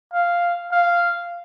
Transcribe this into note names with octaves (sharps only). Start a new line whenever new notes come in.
F5
F5